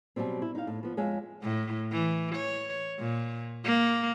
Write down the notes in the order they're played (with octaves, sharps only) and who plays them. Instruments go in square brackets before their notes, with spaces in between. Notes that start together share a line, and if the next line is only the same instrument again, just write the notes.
[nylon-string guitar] B2 E3 F#3 G3 C4
E4
D#4 F5
A2
F3 B3
F2 G#3 C#5 E5 F5
[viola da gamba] A2
E3
C#5
A#2
A#3